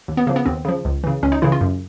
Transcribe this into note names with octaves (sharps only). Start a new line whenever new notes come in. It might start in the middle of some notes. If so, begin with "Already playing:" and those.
D#2
B3
C#3 F3 A#3
B3
D#2 C4
C#3 F3
C#2
C#3 E3
C#2 C#4
D#4
C#3 E3 E4
F4
F#2